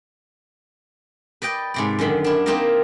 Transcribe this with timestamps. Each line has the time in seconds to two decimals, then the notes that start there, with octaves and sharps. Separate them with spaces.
1.42 B4 D5 D#5 G5
1.74 G#2 C3 D5
1.99 F#2 D3 D#3 B5
2.24 D4 E4
2.46 A#3 C4 D#4 E4 G4 A#4